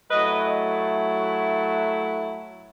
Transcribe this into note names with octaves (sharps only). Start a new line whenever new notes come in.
F#3 A3 E4 B4 D#5